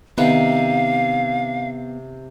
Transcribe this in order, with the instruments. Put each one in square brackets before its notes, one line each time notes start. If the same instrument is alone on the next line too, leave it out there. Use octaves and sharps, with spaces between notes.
[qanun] C3 D#3 [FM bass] B3 [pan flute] F5